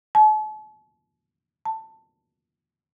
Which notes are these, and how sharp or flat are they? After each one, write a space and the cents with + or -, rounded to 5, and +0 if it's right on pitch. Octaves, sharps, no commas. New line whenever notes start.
A5 -40
A5 +15